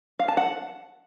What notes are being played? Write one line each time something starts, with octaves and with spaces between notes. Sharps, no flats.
F5
A5
F#5